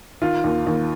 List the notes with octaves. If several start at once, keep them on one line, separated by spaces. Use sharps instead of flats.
D#3 F4
D#2
D#2